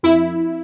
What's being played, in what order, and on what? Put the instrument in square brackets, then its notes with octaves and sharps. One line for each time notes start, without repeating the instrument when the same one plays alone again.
[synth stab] F2 E4